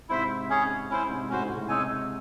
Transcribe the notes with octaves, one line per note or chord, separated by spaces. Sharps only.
G#2 C3 E4 C5 E5
C#4 G#4 C#5
C#4 E4 C5
G#2 C3
A2 C#4 F#4 C5
G#2 C3
A2 C#3
G#2 C3 G#3 D#4 A4 C#5 G#5